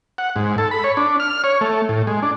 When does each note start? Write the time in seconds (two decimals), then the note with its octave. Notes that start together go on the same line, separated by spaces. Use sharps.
0.18 F#5
0.36 G#2
0.58 A4
0.71 B5
0.84 C#5
0.97 D4
1.20 F6
1.44 C#5
1.61 A3
1.89 A2
2.07 G#3
2.23 D4